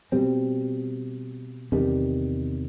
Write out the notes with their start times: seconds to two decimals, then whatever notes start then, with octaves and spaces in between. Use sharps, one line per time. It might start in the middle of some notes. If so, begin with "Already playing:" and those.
0.12 B2 G3 C4
1.72 E2 C3 D#3 G3